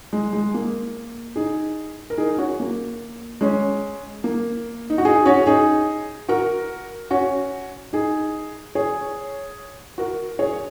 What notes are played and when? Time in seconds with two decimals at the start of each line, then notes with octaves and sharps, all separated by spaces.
0.13 G#3
0.33 G#3
0.54 A#3
1.36 D#4 G#4
2.10 A#4
2.17 D#4 G#4
2.38 C#4 F#4
2.60 A#3
3.41 G#3 C#4
4.24 A#3
4.90 D#4
4.98 F#4
5.05 D#4 G#4
5.25 C#4 F#4
5.46 D#4 G#4
6.29 F#4 A#4
7.11 C#4 F#4
7.93 D#4 G#4
8.75 G#4 C#5
9.98 F#4 A#4
10.39 G#4 C#5